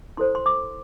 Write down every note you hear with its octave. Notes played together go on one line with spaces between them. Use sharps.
E4 A4 C5 C6
C6
D6